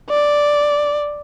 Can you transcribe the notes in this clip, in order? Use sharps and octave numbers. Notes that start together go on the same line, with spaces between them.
D5